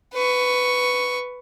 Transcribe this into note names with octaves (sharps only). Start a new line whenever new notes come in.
B4 C#6